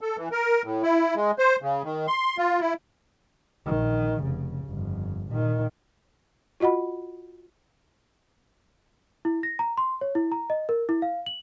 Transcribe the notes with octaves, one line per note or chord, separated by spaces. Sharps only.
A4
E3
A#4
A2
E4
G#3
C5
C#3
D#3
C6
F4
E4
A#1 D#3
F1 C#3
G1 F2
A#2 D#3
F4 F#4 D#5 F#5 B5
E4
A#6
A#5
C6
C#5
E4
A#5
D#5
A#4
E4
F5
F#7